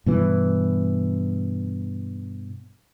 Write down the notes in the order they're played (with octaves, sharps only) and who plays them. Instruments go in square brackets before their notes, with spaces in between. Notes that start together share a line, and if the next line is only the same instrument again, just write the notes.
[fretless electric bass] G2 B2 E3